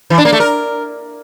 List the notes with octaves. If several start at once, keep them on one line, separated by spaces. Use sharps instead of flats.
E3
D4
A#3
A3
A#4